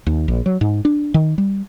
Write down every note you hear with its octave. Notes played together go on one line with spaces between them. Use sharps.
D#2
A#1
F#3
G#2
D4
D#3
G3